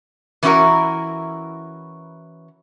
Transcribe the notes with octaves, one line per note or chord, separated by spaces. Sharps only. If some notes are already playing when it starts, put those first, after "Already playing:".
E3 B3 C#4 E4 F#4 A#4